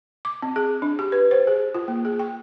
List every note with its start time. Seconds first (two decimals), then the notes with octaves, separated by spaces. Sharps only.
0.25 D6
0.42 C4
0.56 G#4
0.82 D4
0.99 G4
1.12 B4
1.31 C5
1.47 G#4
1.74 F4
1.88 A#3
2.05 G#4
2.19 G5